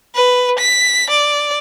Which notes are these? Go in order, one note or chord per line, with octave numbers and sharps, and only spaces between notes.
B4
B6
D5